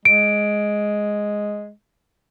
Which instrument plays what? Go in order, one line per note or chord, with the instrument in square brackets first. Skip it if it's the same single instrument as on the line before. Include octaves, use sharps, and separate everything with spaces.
[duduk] G#3 [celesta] D7